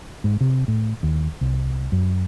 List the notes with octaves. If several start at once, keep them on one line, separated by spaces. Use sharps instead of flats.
G#2
C3
A2
D#2
C2
F#2